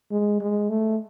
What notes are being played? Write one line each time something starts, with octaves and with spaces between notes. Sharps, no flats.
G#3
G#3
A3